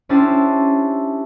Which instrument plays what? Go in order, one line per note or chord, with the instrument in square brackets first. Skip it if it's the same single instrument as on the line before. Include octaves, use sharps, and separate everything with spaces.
[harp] C#4 D4 E4 G4 C5 A5